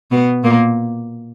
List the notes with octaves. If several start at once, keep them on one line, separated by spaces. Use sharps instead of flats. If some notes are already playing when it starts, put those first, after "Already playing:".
B2 B3
A#2 A#3